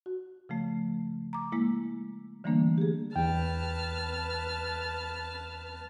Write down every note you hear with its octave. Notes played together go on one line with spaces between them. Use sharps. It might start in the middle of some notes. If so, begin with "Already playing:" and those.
F#4
C#3 F3 A3
A#5 D6
G#3 A#3 E4
D3 E3 G3 A3 A#3 D4
G4 G#4
E2 B4 G5 A5 F6